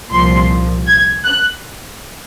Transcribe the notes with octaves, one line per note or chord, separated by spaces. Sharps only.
C2 A#2 F3 C6
G#6
F#6